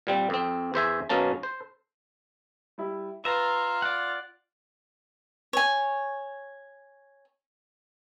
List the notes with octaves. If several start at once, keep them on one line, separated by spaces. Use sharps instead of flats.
A#2 G3 C4
F2 C4
E2 C5 E5 G#5
F#2 B2 A#3 C#4 A5
C5
G3 E4
F4 B4 E5 A#5
D5 F#5
C#5 G#5